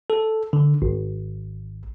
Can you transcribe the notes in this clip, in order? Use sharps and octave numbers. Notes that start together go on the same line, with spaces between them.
A4
D3
G#1